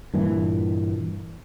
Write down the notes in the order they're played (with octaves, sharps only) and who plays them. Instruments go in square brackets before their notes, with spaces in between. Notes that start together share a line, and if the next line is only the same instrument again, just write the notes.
[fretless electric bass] G2 A#2 E3